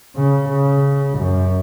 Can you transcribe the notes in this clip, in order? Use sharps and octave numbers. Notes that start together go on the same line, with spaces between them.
C#3
C#3
F#2